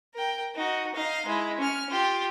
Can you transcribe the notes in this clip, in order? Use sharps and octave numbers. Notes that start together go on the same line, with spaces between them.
A#4 G5
D#4 F#4
D#4 F5
G#3 E4
C#4 F6
F4 G4